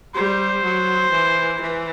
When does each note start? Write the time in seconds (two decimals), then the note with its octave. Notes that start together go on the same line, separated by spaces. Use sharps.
0.15 G3 C5
0.63 F#3
1.12 E3
1.61 E3